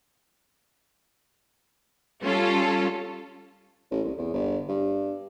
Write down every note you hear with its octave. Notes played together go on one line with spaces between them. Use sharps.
G3 C#4 F4 A4
A1
C2
E2
G1
G2